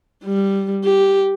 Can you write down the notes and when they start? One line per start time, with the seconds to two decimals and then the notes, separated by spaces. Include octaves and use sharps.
0.25 G3
0.84 G4